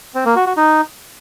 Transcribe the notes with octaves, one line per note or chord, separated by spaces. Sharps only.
C4
A#3
F#4
F#4
D#4